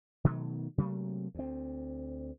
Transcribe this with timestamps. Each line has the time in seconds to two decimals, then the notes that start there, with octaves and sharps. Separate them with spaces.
0.24 B2 D#3 F#3 A3
0.78 C3 F#3 A3 A#3
1.35 D2 C4